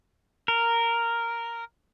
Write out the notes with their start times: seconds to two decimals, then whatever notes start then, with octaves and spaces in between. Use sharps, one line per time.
0.48 A#4